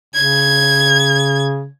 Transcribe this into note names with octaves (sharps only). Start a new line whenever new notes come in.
C#3 G#6